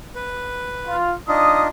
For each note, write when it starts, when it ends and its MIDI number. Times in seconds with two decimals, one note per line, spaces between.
0.15 0.96 71
0.86 1.12 65
1.28 1.68 62
1.28 1.68 63
1.28 1.68 65
1.28 1.60 87